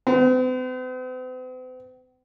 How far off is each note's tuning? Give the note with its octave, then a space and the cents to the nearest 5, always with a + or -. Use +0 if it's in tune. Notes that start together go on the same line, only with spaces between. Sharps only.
C4 -45